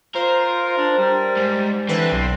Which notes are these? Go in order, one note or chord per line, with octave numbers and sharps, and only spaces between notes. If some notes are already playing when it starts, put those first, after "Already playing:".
F4 A#4 C5
D4
G3
G#2
D3 E3 C4 B4
B1